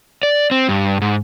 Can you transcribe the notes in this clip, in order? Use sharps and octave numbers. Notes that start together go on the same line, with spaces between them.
D5
C4
G2
G#2